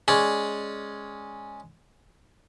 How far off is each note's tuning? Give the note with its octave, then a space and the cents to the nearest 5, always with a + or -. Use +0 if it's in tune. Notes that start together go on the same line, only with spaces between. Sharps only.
G#3 +0 C#4 +0 D5 +0